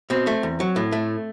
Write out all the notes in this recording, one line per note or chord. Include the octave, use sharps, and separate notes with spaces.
B2 C4
A3
E2
F#3
A2
A3